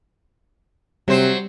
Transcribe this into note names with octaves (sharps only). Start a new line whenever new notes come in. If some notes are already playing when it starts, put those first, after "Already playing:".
C3 F#3 G3 C5